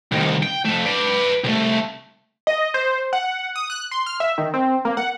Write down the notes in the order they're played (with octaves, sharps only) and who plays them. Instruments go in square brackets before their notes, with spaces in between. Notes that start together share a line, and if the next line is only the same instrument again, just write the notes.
[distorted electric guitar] C2 D#3
G5
F2 A3
B4 D5
C2 A3
[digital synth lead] D#5
C5
F#5
D#6
F#6
C6
F6
E5
D#3
C4
A#3
F#5